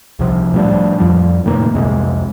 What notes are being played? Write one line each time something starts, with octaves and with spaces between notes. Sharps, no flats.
C2 C3 F3
A2 F3 G3 D4
F2 F3 G3
A2 C3 D#3 A#3
C2 F2 C3 G#3